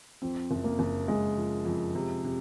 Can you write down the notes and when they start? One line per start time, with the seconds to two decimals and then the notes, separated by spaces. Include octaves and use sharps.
0.22 F2 C4
0.51 F#1
0.64 A#3
0.79 F#1
1.08 F#1 G#3
1.37 F3
1.65 F2
1.95 C3
2.24 C3